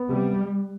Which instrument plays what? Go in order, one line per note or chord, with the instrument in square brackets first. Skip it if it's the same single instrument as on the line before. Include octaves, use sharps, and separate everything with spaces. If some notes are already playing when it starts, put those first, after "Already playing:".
Already playing: [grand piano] B3
[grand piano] C3 [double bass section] G3